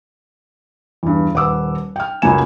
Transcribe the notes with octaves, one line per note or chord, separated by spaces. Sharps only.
E2 G2
D#1 B4 F#5 D6 E6
G5 F6
C#2 F#2 F#3 A#3 G#5 E7